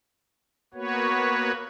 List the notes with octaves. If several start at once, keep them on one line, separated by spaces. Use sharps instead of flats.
A#3 B3 F#4 B4 C#5